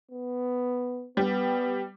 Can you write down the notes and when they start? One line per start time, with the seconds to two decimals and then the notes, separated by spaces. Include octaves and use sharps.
0.11 B3
1.17 G3 B3